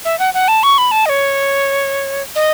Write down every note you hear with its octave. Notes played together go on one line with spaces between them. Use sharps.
E5
F#5
F#5
A5
C#6
B5
A5
D#5
C#5
D#5